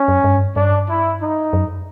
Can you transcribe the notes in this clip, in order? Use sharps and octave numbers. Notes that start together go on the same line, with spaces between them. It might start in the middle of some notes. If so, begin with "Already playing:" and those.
Already playing: C#4
F#2
G2
G2 D4
E4
D#4
F#2